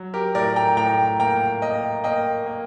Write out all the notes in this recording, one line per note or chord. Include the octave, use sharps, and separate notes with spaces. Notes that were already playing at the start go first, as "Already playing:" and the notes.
Already playing: F#3
G4 A#4
A2 A#4 D5
G5 A#5
A2 G5 A#5
A#3 G5 A#5
A#3 D#5 G5
A#3 D#5 G5
A#3